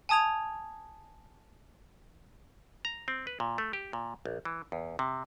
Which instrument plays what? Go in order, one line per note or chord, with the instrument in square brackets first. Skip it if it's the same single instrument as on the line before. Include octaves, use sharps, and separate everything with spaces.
[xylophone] G#5 A5 D#6 G#6 F7
[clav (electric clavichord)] A#5
C4
B4
A#2
A3
G4
A#2
A#1
E3
E2
C3